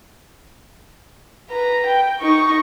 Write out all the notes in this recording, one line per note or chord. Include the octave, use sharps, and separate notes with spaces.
B4 A#5
G5
D#4 C#6